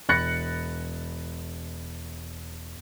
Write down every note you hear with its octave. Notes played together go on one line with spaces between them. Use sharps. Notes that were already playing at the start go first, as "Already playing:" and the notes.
E1 B5 F#6 A6 A#6 C#7